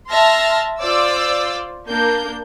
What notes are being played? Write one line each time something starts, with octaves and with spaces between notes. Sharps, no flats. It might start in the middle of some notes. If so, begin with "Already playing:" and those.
E5 A5 C6 F6 A#6
F4 C5 D5 D6 E6
A#3 D4 G6